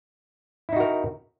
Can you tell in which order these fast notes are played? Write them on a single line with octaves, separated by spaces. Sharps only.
E4 D#4 F#4 A#4